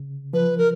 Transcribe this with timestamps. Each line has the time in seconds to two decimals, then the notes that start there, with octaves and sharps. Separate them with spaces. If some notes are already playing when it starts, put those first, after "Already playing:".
Already playing: C#3
0.33 F3 B4
0.58 A#4